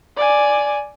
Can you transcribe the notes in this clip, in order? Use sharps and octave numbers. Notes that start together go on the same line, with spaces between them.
D5 G#5